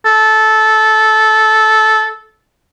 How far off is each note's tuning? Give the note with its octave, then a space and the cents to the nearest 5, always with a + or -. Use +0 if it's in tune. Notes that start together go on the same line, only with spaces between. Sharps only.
A4 -15